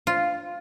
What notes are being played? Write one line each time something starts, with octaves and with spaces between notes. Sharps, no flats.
F4